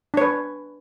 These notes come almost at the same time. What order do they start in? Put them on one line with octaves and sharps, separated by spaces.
D4 C#5 B4